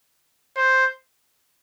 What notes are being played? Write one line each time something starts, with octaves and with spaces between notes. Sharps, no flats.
C5